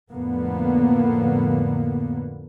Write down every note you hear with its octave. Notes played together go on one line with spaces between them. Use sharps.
F2 A2 D3 A#3 B3